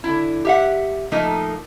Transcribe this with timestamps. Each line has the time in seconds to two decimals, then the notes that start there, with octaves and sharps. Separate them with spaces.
0.04 D3 E4
0.45 G4 E5 F#5
1.12 F3 A3 A#3 D#4